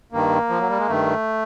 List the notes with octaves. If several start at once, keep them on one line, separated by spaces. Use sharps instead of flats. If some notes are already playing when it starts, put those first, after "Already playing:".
G2 D#3 A#3
F3
F#3
G3
G#3
G2 D#3 A3